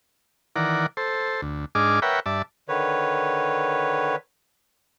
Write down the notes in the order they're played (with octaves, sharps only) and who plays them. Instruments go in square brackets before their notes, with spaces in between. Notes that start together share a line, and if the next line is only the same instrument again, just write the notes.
[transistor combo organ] D#3 E3 A#4 D5 F#5
A4 C5
D2
G#2 D4 G#4 D#5 D6 F6
A#4 B4 C#5 E5 F#5 G5
G2 D5 E5 A5
[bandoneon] D3 D#3 B4 C#5